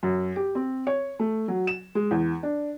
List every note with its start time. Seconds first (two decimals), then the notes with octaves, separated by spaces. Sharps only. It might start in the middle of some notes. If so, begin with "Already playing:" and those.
0.03 F#2
0.36 G4
0.55 C4
0.87 C#5
1.19 A3
1.48 F#3
1.67 E7
1.95 G#3
2.11 E2
2.43 D4